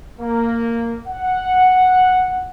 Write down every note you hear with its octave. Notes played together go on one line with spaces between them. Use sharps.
A#3
F#5